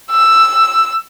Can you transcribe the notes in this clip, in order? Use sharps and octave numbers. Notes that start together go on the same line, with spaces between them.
E6